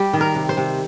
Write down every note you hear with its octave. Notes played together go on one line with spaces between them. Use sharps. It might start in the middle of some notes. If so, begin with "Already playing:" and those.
Already playing: G3 G4
D#3
A#4
C3
C5
C3